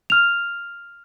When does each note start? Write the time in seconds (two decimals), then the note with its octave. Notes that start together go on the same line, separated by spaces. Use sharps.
0.10 F6 F7